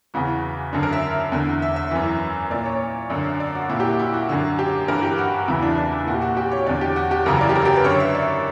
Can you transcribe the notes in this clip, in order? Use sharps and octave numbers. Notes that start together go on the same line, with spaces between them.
E2 C#3 E3 F#4
F#2 D3 D4
A#4
E5
E2 D3
E5
E5
F#2 E3
A#2 D5
C#5
F#2 D3 D5
D5
F#4
A#2 E4
G4
F#4
E4
F#4
F#2 D3
G4
G2 E3 A#4
G4
F#4
E2 C#3 E3 E4
D4
D4
E4
A#2 F#4
G4
F#4
G4
C#5
E2 D3 D5
G4
F#4
G4
F#2 C#3 E3 A#4
D5
G4
A#4
G4
B4
F#2 D3 C#5
E5
D5